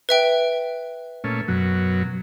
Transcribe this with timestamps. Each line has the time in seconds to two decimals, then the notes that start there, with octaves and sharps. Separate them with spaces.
0.09 B4 E5 G5
1.24 A#2 A3 C#4
1.48 F#2 B2 F#3